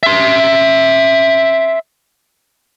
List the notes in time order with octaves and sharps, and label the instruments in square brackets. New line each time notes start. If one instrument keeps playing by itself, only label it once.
[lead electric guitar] E5 C6